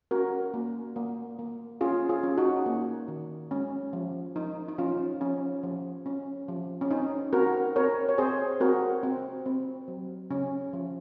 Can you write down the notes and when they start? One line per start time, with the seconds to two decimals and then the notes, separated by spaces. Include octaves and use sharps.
0.11 C#4 F#4 A#4
0.54 A#3
0.96 A#3
1.39 A#3
1.81 C#4 F4 G#4
2.09 F4 G#4
2.23 C#4
2.38 D#4 F#4
2.66 A#3
3.08 D#3
3.51 G#3 C#4
3.93 F3
4.36 F3 D#4
4.68 D#4
4.78 F3 C#4 F4
5.21 F3 C#4
5.63 F3
6.06 C#4
6.48 F3
6.81 C#4
6.91 C4 D#4
7.33 C4 F#4 A#4
7.76 C4 A#4 C#5
8.09 C#5
8.18 C4 G#4 C5
8.60 C4 F#4 A#4
9.03 C4
9.46 C4
9.88 F#3
10.30 C#3 C#4
10.73 F3